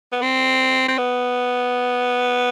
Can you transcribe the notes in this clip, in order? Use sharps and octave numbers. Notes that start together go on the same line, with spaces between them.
B3
C4
C4
B3